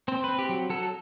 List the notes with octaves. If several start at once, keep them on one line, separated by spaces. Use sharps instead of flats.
C4 C5
C4 B4
G4
F#3
F#3 A4